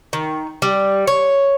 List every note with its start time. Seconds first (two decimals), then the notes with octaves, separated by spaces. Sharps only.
0.13 D#3
0.62 G3
1.07 C#5